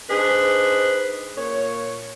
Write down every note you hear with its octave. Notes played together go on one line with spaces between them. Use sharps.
D4 D#4 G#4 B4 C5
A#2 C#5